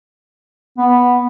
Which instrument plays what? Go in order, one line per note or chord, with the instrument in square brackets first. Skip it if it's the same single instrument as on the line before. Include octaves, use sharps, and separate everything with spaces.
[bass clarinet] B3